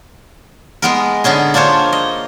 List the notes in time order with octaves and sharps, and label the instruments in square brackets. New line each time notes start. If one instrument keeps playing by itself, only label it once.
[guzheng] G#3 B3 A#4
D3 B3 C#4 G#4
A#3 D4 F4 C5 C#5
D#5